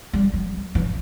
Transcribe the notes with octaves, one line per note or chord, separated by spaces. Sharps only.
G3
F#3
E3